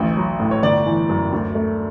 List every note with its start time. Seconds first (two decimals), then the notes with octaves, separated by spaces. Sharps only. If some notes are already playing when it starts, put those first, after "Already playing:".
Already playing: A1 D2
0.17 F#3
0.40 A2
0.51 C#5
0.63 G1 D5
0.86 E3
1.09 F#2
1.32 D2
1.55 A3